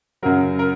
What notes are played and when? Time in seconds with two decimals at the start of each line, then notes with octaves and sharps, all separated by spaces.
0.22 F#2 C#3 F#3 A#4
0.59 A#4